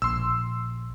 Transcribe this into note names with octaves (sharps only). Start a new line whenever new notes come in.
A#1 C6 E6